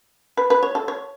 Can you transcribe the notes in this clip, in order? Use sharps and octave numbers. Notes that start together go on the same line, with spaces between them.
B4
B4
C#5
A4
C#5